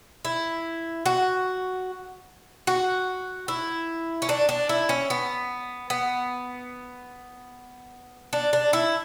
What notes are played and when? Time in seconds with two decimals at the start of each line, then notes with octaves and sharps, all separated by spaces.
0.25 E4
1.06 F#4
2.67 F#4
3.48 E4
4.22 C#4
4.29 D4
4.49 D4
4.69 E4
4.89 C#4
5.10 B3
5.90 B3
8.33 D4
8.53 D4
8.73 E4